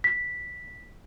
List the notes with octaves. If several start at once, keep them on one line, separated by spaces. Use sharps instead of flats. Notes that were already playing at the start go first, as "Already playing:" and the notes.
B6